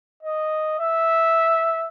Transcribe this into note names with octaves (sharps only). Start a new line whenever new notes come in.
D#5
E5